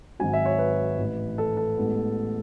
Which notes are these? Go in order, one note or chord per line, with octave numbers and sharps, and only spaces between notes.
G#1 G#2 F#3 G#5
E5
C#5
B4
A1 A2 E3
A4
A4
A1 A2 E3 G#3 B3